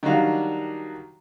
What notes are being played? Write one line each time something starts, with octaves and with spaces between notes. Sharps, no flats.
D#3 F#3 G3 D4 F#4 F5